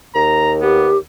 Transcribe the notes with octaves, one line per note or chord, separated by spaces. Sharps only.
D#2 A#5
B3 G4